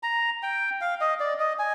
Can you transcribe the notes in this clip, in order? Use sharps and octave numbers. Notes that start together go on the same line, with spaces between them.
A#5
G5
F5
D#5
D5
D#5
G#5